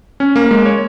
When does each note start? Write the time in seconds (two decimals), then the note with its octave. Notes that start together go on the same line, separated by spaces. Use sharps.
0.20 C#4
0.36 A#3
0.51 G#3
0.66 C#5